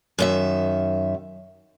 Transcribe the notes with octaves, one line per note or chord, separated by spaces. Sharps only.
F#2 D#3 E5